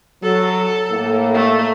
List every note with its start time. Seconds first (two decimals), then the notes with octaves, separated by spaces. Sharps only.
0.23 F#3 A4
0.91 A2 A#3
1.34 A3